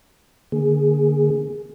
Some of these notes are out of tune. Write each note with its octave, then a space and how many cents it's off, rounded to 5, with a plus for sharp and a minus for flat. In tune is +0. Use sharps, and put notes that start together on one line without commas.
D3 +0 A#3 +0 G#4 +0